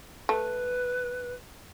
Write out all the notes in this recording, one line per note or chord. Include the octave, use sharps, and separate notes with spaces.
A3 B4